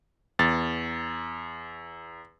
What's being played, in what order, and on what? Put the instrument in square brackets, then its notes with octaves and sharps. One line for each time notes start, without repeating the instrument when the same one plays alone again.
[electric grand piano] E2 A6